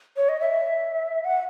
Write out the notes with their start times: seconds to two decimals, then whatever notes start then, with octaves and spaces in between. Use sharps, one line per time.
0.17 C#5
0.29 D#5
0.40 E5
1.24 F#5